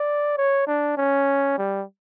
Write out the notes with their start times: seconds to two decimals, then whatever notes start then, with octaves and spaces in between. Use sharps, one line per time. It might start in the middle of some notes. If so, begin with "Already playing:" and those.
Already playing: D5
0.38 C#5
0.67 D4
0.97 C#4
1.58 G3